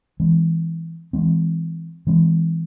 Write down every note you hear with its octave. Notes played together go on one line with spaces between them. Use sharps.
E3 G#3 C4
E3 G#3 C4
E3 G#3 C4